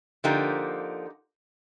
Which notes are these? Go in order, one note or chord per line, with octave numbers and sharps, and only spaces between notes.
D3 F3 A#3 D#4 G4